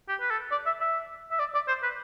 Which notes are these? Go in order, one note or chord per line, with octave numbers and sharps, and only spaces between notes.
G4
B4
A4
D5
E5
E5
E5
D5
D5
C5
B4